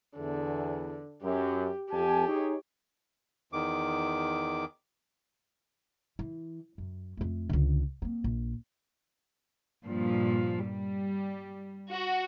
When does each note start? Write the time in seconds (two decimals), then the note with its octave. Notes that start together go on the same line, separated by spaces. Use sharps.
0.17 E2 D3
1.23 F#2 G4
1.92 F2 G4 G#5 A5
2.27 D#4 G#4 C#5
3.53 E2 D#3 D6
6.19 E3
6.78 F#2
7.17 F2 A3
7.49 C#2 D3
8.02 A#3 C4
8.24 A#1
9.83 G2 A#2 F3
10.62 G3
11.91 F#4